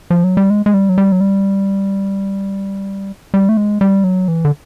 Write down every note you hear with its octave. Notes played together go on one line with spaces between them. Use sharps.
F3
F#3
G3
G#3
G#3
G3
F#3
G3
F#3
G3
G3
A3
G#3
G3
F#3
E3
D3